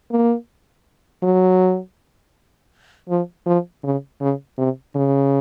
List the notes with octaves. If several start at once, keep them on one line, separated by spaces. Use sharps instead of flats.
A#3
F#3
F3
F3
C#3
C#3
C3
C#3